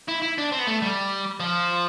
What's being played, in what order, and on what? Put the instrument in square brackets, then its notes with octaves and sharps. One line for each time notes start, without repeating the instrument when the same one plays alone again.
[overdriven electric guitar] E4
E4
D4
C4
B3
A3
G3
F3